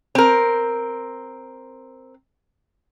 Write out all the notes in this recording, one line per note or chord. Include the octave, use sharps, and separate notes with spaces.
C4 A#4